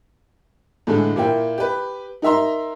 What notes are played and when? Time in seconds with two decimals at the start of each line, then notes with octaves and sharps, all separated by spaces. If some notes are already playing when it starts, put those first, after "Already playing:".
0.87 A2 D3 E3 G#3 A4
1.16 A#2 A#3 E4 G5
1.58 G4 B4
2.22 D#4 A#4 E5 A#5 C6